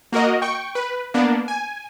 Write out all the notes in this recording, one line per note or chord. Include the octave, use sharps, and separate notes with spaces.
A#3 F#4 A#4 D#5
G5 C#6
B4
A#3 B3 D4
G#5